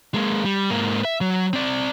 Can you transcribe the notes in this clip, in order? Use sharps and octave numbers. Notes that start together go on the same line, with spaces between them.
G#3 A#3
G3
G#2 A#3
E5
F#3
C4 D5